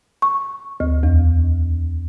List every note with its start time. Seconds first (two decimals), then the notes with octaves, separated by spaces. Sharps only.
0.22 C#6
0.80 D2
1.03 E2